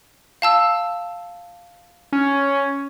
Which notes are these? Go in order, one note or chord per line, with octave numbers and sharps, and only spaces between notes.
F5 A5 E6
C#4